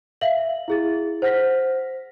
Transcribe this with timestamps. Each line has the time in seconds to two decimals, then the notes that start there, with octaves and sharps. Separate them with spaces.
0.21 E5 F5 F#7
0.68 E4 G#4 A6
1.22 C5 F#5 F6 A#6 B6